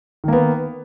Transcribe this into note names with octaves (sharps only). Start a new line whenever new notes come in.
D#3 A#3 B3